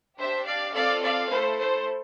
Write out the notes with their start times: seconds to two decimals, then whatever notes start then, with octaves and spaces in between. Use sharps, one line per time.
0.18 D4 G4 C5 E5
0.46 D5 F5
0.74 C4 F4 A4 D5 F5
1.02 D5 F5
1.31 A3 E4 A4 C5
1.59 C5